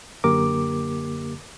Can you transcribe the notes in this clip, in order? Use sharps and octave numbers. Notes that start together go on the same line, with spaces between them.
F#2 D3 A#3 G4 A#4 D6